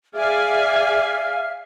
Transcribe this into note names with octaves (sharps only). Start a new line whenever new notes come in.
G#4 D5 E5 F5 G#5 F6